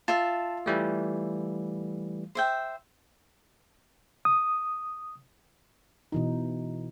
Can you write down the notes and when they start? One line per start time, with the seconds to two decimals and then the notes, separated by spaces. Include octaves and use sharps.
0.08 F4 E5 A5
0.66 E3 G3 A3
2.35 C5 E5 G5
4.25 D#6
6.12 B2 E3 D#4